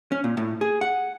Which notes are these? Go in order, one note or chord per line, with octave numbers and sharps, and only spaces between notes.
C#4
A#2
A2
G#4
F#5